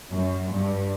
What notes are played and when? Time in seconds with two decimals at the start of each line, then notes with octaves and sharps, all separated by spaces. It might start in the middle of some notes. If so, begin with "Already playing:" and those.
0.10 F#2
0.50 G2